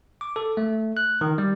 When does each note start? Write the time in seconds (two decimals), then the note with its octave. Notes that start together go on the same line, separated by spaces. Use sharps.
0.21 D6
0.36 A4
0.57 A3
0.97 F#6
1.21 D#3
1.38 G3